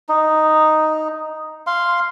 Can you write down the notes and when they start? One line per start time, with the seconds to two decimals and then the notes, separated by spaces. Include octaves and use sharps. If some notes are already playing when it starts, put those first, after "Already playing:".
0.09 D#4
1.67 F5 C6